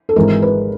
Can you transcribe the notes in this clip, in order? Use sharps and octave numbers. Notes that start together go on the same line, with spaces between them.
A4
G#1 G#2 E3 G#3 A#4
B4